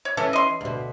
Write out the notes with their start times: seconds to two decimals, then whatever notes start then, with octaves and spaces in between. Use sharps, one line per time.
0.05 C#5
0.17 E3 C#4 A4
0.33 D#5 C6
0.61 D2 B2